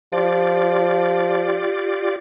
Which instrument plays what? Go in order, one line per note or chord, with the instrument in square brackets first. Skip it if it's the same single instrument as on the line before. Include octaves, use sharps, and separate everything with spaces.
[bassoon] F3 [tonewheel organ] F4 G4 D5